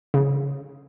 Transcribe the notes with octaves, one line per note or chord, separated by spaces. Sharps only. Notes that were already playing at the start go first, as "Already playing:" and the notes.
C#3